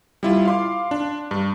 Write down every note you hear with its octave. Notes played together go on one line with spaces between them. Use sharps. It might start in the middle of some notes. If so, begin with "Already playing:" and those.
G3 E4 F4
F5 C6 D6
D4
G2